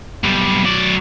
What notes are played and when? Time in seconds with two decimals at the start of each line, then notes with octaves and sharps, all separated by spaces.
0.24 B1 G3
0.65 F#3 D5